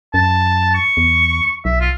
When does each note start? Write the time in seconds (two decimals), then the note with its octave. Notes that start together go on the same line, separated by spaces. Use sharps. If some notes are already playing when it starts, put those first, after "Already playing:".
0.14 F#2 A5
0.75 C#6
0.97 E2
1.65 B1 E5
1.81 F4